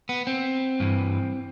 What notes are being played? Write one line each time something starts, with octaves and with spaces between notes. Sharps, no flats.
B3
C4
G2 E3